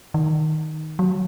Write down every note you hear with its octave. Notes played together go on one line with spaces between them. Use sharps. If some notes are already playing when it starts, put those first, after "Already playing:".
D#3
F#3